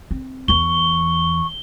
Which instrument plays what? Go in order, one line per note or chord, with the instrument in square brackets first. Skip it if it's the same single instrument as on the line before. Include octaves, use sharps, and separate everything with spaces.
[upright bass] C4
[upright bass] E2 E3 [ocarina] C#6 [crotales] G7